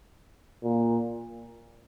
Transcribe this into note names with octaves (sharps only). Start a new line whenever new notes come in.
A#2